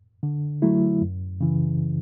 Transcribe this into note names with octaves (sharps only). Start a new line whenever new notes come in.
D3
F#3 A3 E4
F#2
C#3 E3